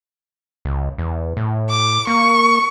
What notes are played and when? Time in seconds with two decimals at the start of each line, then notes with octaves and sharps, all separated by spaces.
0.65 C#2
0.98 E2
1.37 A2
1.69 D6
2.07 A#3 C#6